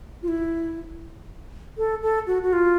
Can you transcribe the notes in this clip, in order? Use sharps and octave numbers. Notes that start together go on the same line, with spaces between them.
F4
E4
A4
A4
F#4
F#4
F4